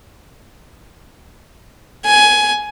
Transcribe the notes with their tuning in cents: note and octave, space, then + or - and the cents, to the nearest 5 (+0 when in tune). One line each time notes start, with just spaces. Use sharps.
G#5 +15